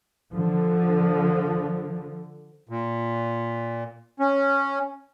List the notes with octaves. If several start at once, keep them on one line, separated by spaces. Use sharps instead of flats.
D3 F3
A#2
C#4